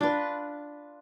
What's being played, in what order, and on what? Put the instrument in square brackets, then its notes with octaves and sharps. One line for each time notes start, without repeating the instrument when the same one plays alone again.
[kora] D4 [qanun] F4 B4